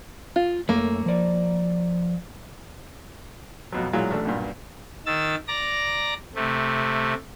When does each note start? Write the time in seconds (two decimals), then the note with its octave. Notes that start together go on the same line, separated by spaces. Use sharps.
0.36 F4
0.69 F#2 A3 A#3
1.06 F3 D5
3.73 F2 B2 F#3
3.93 A#2 F#3 G#3 E4 F4
4.10 A1 A3 D4
4.25 B1 G2 A#2
5.06 D#3 E6 A6
5.48 D5 A#5 A#6
6.35 C3 A3